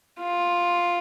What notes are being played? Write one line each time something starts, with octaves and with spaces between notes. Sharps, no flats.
F4